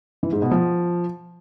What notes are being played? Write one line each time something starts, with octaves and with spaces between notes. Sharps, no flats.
E3
G#2
B2
F3